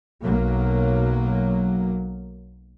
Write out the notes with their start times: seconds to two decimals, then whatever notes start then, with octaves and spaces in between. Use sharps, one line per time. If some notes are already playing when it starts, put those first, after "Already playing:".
0.22 B1 F#3 A#3